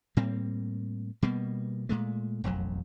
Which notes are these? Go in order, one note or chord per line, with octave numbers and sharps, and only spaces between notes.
A2 G3 A#3 C4
B2 G3 A#3 B3
A#2 G#3 A3
E1 A1 F2 F#3